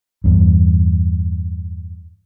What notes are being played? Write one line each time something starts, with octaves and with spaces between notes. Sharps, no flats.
E2 G2